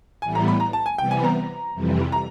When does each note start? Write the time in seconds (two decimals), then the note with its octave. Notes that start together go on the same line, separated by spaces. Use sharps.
0.22 A2 E3 G3 B3 G#5
0.35 A#5
0.48 B5
0.60 A#5
0.73 A5
0.86 G#5
0.98 C3 E3 G3 B3 G5
1.11 G#5
1.24 A#5
1.74 F2 C3 E3 G3
2.12 A#5